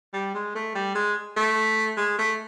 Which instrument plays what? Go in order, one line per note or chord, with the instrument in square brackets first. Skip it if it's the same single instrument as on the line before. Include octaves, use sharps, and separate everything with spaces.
[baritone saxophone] G3
G#3
A3
G3
G#3
A3
G#3
A3